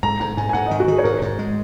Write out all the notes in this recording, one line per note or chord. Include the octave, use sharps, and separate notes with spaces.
G#2 A#5
G#2 A#5
G#2 G#5
G#5
G#2 F#5
D#3 D#5
F#4
D#3 G#4
C#5
G#2 A#4
G#2
G#3